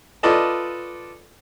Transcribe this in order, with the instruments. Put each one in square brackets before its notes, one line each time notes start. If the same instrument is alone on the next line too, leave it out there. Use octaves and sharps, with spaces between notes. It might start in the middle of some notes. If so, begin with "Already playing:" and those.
[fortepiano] F4 A4 B4 D5 D#5 A5